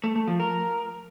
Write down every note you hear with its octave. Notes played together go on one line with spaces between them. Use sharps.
A3
A3
F3
A#4